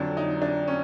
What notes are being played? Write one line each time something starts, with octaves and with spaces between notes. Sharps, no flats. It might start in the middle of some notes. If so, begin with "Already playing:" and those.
Already playing: F2 D3 F#3 D4
D#4
D4
C#4